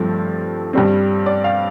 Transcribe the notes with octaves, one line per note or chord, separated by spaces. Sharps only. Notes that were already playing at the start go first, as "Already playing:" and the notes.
Already playing: G2 F3 A3 C4
G2 G3 C4
D5
F5